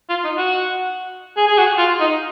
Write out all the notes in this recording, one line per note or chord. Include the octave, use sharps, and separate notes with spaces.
F4
D#4
F#4
G#4
G#4
F#4
F4
D#4